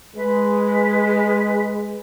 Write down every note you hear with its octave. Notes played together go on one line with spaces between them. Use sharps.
G#3 B4